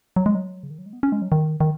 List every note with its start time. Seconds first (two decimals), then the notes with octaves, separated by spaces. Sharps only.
0.16 F#3
0.26 G#3
0.35 F#3
0.63 C#3
0.70 D#3
0.78 F#3
0.86 G#3
0.93 B3
1.03 C#4
1.12 G#3
1.22 F#3
1.32 D#3
1.60 D#3